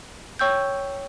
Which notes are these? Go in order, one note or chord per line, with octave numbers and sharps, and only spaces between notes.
C#5 G5 C#6 E6 G6